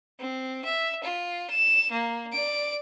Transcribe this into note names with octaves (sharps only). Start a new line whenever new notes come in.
C4
E5
F4
E7
A#3
D5 D7